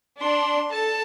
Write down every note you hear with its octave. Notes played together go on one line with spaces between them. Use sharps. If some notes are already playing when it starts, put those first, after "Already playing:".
D4 C6
A4 A5